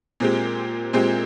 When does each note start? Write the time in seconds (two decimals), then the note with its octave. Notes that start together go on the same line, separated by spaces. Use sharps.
0.20 A#2 G#3 C4 G4
0.93 A#2 G#3 C4 G4